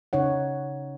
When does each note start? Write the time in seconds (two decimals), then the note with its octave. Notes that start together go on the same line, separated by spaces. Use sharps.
0.13 C#3 D#4 C#5 F#5